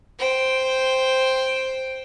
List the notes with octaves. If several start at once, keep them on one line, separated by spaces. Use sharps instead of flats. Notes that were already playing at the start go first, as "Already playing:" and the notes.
C5 G5